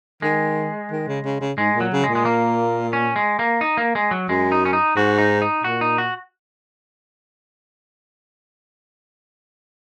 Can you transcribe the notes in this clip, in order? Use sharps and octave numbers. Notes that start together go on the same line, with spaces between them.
D#3 G#3
D#3
C#3
C#3
C#3
G#2 G#3
A#2
F#3
C#3
G#3
A#2
G#3
A#3
C#4
G#3
A#3
D#4
A#3
G#3
F#3
F#2 G#3
D#4
C#4
D#4
G#2 F#4
D#4
D#4
A#2 F#4
D#4
F#4